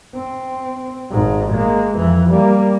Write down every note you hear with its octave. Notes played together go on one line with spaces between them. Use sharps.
C4
G#1 G#2
G#3 A#3
F2 E3
G3 A#3